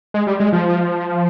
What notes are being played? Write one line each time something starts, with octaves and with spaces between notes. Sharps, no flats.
G#3
G3
G#3
F3